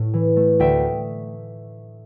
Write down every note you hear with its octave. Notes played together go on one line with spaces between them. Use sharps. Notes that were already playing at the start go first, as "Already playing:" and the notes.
Already playing: A2
E3
A3
D2 E5 G5